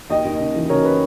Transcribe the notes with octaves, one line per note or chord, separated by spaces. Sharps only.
D#2 D#5 G5
D#2
C#3
E3
C#3 A#4 C#5
B4